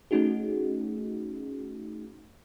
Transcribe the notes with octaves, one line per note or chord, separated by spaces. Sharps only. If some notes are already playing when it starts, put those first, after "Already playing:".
A3 C#4 D#4 F#4 G#4